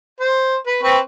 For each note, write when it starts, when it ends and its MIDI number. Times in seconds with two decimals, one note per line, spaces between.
0.20 0.56 72
0.66 0.79 71
0.83 0.98 60
0.83 0.98 71
0.83 0.98 85